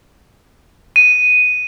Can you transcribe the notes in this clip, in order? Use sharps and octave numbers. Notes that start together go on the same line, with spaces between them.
D#7